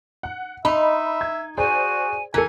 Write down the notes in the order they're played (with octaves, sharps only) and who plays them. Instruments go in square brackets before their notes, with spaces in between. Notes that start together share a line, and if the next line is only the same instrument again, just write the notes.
[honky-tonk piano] F#5
[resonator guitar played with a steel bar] D#4 [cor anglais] E5 [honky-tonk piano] B5 C6
[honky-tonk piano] G#6
[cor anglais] F#4 [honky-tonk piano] G#4 C5 D5 [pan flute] G#5
[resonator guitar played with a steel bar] E3 [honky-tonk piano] A4 A#4 [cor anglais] G#5